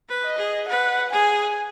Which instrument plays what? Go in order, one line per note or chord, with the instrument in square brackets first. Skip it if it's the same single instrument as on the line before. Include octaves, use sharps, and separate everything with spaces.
[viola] B4
[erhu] D#5
[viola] G#4
[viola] B4 [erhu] F#5
[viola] G#4 [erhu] G#5